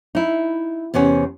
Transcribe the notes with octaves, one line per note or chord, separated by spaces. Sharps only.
D#4 E4
E2 C3 B3 C#4